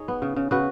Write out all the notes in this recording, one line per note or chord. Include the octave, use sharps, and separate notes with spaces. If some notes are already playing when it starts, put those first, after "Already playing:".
Already playing: D#4 G#4 C#5
B3
C#3
C#3
C#3 F#4 B4